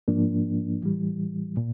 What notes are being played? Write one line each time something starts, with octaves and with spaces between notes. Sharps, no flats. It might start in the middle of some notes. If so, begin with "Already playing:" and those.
G#2 F3 A#3 D4
A2 E3 G3
A#2